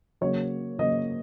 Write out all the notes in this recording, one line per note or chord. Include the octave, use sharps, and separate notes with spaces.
C#3 F#3 A#3 C#5
C#3 F#3 A#3 D#5